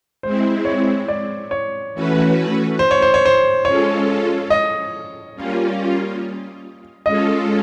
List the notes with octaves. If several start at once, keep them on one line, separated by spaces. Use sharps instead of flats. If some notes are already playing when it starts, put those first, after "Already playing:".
G#3 C4 E4 C5
C#5
D5
C#5
E3 A3 C#4 F#4 B4
C5
C#5
C5
C#5
C5
G#3 C#4 F4 A4 C#5
D#5
G3 A#3 C#4 F4
G#3 C#4 F4 A4 D#5